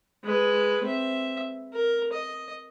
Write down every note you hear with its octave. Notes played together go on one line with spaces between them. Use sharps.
G#3 B4
C4 E5
A#4
D#5